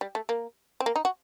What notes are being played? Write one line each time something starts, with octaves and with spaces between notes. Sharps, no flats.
G3
A3
A#3
C4
A#3
D#4
F#4